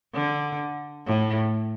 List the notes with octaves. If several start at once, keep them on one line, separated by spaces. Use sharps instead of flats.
D3
A2